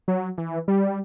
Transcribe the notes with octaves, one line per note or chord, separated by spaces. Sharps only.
F#3
E3
G3